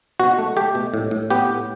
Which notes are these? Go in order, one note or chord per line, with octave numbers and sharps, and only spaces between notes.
B2 F#4
A3
A3 G4
B2
A2
A2
B3 G4
A2